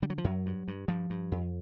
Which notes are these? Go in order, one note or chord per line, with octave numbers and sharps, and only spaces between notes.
D3 G3
F#3
F3
F#2 F#3
G2
G2
G2 F3
G2
F2